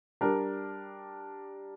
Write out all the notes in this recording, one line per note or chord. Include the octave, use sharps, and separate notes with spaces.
G3 D4 A#4